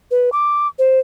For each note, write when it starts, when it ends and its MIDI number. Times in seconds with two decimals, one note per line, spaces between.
0.11 0.30 71
0.32 0.67 86
0.79 1.00 72